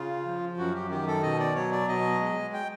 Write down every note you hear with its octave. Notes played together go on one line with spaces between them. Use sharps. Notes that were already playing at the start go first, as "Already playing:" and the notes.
Already playing: C#3 F4
F3
F#2 F#4
G4
D#3 G4
A4
B2 D#5
D5
F#3 C#5
D5
B2 D#5
G#3
G5